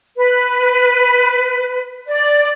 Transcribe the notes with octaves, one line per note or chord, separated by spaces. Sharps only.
B4
D5